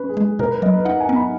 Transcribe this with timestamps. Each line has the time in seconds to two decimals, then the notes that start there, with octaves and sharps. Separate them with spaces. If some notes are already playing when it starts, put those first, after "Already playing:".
Already playing: C#4 B4
0.09 G#4
0.17 G#3
0.24 G#4
0.39 B2 A#4
0.51 B4
0.62 F#3 D#5
0.74 B4
0.85 D#4 F#5
1.00 G#5
1.09 B3
1.16 B5